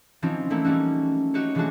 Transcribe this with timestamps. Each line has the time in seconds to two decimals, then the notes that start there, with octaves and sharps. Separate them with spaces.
0.22 E3 F3 C4 C#4 D#4
0.50 F3 A3 A#3 E4
0.64 G3 C#4 D#4 F#4
1.34 D#4 F#4 G4 C#5
1.55 E3 F3 G#3 A3 D4 F#4